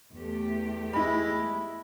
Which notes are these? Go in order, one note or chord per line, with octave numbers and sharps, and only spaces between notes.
E2 A3 G4
G#3 E4 B5